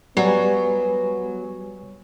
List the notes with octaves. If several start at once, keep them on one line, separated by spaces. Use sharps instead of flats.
F#3 G3 B3 F#4 B4 D5 G#5